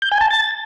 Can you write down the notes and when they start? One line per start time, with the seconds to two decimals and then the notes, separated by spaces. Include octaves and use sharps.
0.02 G6
0.12 G#5
0.21 A5
0.30 A6